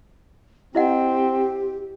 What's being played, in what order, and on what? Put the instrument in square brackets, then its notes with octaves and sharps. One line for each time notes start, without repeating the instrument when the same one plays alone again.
[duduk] C4 [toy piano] E4 D#5 F#5 [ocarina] G4